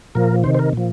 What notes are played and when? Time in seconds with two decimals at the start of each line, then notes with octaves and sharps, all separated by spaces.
0.15 A#2 F3 A#4
0.44 C3 D#3 C5
0.55 C5
0.59 A#4
0.73 A#2 F3